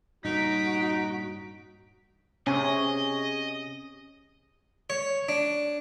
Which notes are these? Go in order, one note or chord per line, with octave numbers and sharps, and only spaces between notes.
G2 A#2 C#3 D#4 F#4 B6 D7
C3 C#4 G#4 D#5 G#5 C#6
C#5
D4